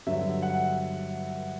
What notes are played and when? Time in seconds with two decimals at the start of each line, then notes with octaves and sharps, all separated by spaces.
0.07 G2 D3 F#3 E5
0.42 F#5